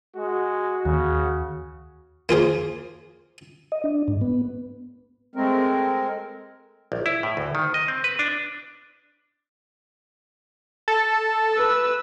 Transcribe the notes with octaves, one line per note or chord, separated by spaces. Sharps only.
G#3 F#4
D#2 C#3
A#3 F4 G#4 C5
D#5
D4
G#2
B3
G#3 A3 C4 A#4
A#1
E4
A2
D2
D#3
D#5
C4
B4
D4
A4
B4 E6